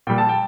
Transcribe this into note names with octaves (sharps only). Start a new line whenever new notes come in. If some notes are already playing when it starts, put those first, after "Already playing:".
A#2 G3 G5
A5
G5